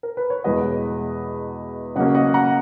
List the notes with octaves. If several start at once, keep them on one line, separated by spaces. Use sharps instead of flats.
A#4
B4
C#5
E2 B2 G#3 B4 D#5
C#3 F#3 A#3 C#4 D#5 F#5
D#5 F#5
F#5 A#5